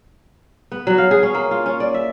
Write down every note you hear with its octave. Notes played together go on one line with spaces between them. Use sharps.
B3
F#3
F5
G#4
C#4
A#3
F4
C#4
D5
E5